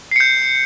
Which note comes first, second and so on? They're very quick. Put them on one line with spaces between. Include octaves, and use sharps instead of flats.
C7 C#7 G6